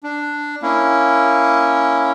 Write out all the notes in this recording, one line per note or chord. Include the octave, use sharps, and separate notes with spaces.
D4
A#3 C#4 E4